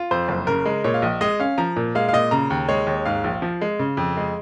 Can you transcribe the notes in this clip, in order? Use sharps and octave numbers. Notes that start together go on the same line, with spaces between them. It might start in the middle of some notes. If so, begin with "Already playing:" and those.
Already playing: F4
F2 C5
F#1
C#3 A#4
G#3
A#2 C#5
F5
A#1 D#5
G#3 D#5
C#4 F5
F3 A#5
A#2
G#3 F5
F5
A#2 D#5
C#3 A#5
D#2
G#3 C#5
D#2
G#2 F5
A#1
F3
G#3
C#3
F2
G#3